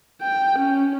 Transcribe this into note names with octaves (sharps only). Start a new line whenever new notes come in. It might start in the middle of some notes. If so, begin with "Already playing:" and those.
G5
C#4